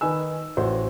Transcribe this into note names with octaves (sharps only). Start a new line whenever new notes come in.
D#3 D#4 B4 G#5 E6
A1 F#4 C5